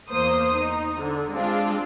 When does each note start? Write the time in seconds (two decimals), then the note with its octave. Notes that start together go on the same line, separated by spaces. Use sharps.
0.10 E2 A#3 C5 D#6
0.54 D#4
1.01 D3
1.31 G#3 C4 D4 F4